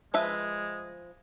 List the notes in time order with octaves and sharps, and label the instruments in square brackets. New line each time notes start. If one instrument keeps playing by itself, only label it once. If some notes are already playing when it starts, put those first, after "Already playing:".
[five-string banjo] F3 B4 E5 [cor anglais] G#3